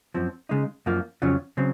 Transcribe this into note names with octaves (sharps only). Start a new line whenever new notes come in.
F#2 F3 C4
C#3 G#3 D#4
F#2 F3 A#3 F4
F2 C#3 F#3 C#4 F4
C#3 F#3 C4